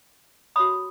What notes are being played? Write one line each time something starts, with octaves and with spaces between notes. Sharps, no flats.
F#4 C#5 B5 D#6